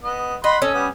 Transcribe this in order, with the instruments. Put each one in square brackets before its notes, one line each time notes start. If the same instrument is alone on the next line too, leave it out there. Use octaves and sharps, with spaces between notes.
[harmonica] B3 D#5
[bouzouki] D#5 [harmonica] F#5 B5 C6
[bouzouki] C#4 [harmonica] A4 D#5
[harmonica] G3 B3 D#6